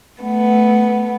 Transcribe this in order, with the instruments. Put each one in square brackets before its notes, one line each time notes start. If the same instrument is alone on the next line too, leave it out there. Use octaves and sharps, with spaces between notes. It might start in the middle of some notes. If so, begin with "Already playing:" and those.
[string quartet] A3 B3